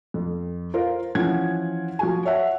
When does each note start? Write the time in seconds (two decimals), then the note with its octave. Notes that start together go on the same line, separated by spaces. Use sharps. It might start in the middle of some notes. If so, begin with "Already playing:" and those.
0.14 F2
0.74 F4 A#4 C5 F5
1.15 E3 F3 C#4 F#5 G#6
1.99 F3 F#4 G#5
2.26 C#5 E5 F#5